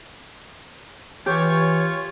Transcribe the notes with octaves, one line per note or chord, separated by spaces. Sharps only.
E3 F4 G4 C#5